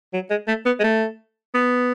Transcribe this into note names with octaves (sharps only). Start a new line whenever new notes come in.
F#3
G#3
A3
B3
G#3
A3
B3